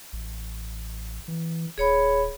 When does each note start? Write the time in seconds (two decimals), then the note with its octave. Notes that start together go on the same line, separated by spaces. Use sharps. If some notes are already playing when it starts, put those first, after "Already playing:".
0.13 A1
1.28 E3
1.78 D#1 G#4 C#5 B5